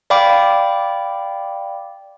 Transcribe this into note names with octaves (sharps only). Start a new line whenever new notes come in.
D5 F5 G5 B5 D6